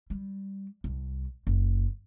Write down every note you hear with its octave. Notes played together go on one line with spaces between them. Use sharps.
G3
C2
F#1